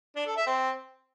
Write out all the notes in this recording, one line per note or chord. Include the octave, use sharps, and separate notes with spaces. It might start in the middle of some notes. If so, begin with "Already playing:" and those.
D4
A4
E5
C4